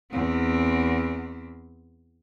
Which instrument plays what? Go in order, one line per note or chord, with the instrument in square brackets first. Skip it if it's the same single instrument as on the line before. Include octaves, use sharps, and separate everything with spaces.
[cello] E2 C4